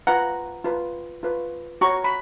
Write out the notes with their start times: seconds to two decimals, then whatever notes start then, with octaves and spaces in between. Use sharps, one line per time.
0.07 F4 B4 F#5 A#5
0.65 F4 B4
1.23 F4 B4
1.81 F#4 C#5 A#5 C#6
2.04 B5